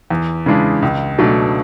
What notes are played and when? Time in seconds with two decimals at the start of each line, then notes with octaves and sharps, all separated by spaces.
0.10 E2
0.46 C#3 E3 G#3 D4
0.82 C#2
1.18 B2 F#3 A3 D4